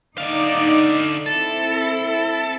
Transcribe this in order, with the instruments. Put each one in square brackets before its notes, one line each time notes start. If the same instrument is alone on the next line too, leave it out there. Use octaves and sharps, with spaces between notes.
[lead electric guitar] D3 F5 [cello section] D#4 D5
[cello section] C4 E4 [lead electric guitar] A4